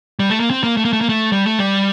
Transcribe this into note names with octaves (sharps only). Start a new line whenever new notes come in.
G3
A3
A#3
C4
A#3
A3
A#3
A3
A#3
A3
G3
A3
G3